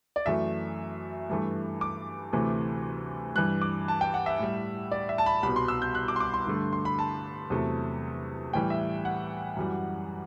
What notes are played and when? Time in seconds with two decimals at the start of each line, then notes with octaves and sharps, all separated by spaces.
0.16 D5
0.26 F#2 E3 A3 E5
1.30 G2 E3 A3
1.81 D6
2.32 D2 C3 E3 A3
3.36 G2 E3 G3 F#6
3.62 D6
3.88 A5
4.01 G5
4.14 F#5
4.26 E5
4.39 A2 G3
4.91 D5
5.09 E5
5.18 A5
5.26 B5
5.43 C2 B2 G3 B5
5.56 C6
5.68 E6
5.82 G6
5.95 F#6
6.08 D6
6.16 C6
6.20 D6
6.34 C6
6.47 G2 D3 A3
6.73 C6
6.85 B5
6.99 A5
7.50 E2 C3 F#3 A3
8.53 A2 E3 G3 G5
8.70 E5
9.05 F#5
9.57 F#2 E3 G3